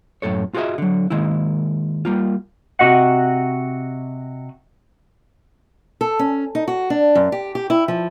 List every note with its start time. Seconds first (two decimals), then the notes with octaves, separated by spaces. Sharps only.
0.22 F#2 A2 A4 C#5
0.54 F4 F#4 G#4 B4 D#5 E5
0.78 D3 F#3
1.10 D#3 G#3 A#3 E4
2.05 G3 A#3 F4
2.79 C3 F#4 D#5 F#5
6.01 A4
6.19 C#4
6.55 D#4
6.68 F#4
6.90 D4
7.15 F#2
7.32 G4
7.55 G4
7.70 E4
7.88 F3